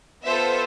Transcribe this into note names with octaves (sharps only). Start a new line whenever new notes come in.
B3 F4 A4 C5 E5